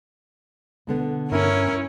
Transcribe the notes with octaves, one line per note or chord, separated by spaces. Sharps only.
B2 D3 B3
G2 C#4 E4 A#4